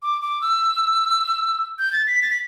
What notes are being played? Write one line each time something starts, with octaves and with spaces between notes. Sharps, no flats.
D6
D6
E6
G6
A6
B6
A6
B6